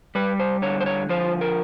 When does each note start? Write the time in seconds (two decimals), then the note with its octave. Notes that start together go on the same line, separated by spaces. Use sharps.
0.15 G3 B4
0.39 C5
0.62 D3 C#5
0.81 C5
0.86 C#5
1.09 F3 C5
1.41 A#4